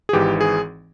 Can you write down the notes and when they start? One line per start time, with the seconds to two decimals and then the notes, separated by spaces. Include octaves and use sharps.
0.09 G#4
0.13 G#1 G#2 E3 G4
0.41 G#4